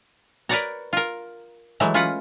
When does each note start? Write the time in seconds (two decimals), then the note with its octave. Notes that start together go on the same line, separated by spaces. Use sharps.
0.49 A#4 B4 C#5 D5 F#5 A#5
0.93 F4 A#4
1.80 E3 F#3 G#3 A3
1.94 C#4 F4 B4 F#5